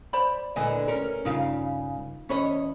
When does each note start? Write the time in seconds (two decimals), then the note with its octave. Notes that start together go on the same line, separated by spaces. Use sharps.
0.13 C5 D5 B5
0.56 A#2 D3 E4 B4 D#5 G#5
0.88 C#4 A#4
1.25 G2 C#3 D#4 F4 F5
2.29 E2 C#4 C#5 D#5 B5